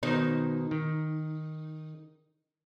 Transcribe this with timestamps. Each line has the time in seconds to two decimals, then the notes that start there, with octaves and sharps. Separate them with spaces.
0.03 B2 D#3 D#4 C5
0.71 D#3